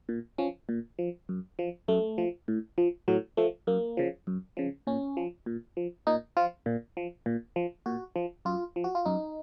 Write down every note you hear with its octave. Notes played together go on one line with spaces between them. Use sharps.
A#2
F3 C#4
A#2
F3
F#2
F3
F#2 A3
F3
A2
F3
A2 F#3
F3 A3
F#2 A#3
C#3 F3
F#2
C#3 F3
A#2 C#4
F3
A#2
F3
A#2 D#4
F3 F4
A#2
F3
A#2
F3
A#2 F#4
F3
F#2 F4
F3
F#4
F4
F#2 D#4